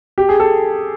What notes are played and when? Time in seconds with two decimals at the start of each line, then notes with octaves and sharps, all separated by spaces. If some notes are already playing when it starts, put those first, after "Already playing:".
0.18 G4
0.29 G#4
0.40 A4